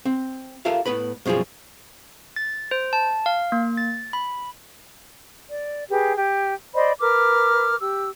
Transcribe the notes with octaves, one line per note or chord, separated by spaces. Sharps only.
C4
F4 G4 A4 A#4 E5 F5
A2 B3 B4 B5
F#2 B2 F3 G3 G#4
A6
C5
A5
F5
A#3
A6
B5
D5
G4 G#4 B4
G4
C5 D5 D#5 B5
A#4 B4 D6 F6
G4 E6